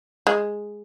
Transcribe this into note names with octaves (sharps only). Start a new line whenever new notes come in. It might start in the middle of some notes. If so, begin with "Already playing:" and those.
G#3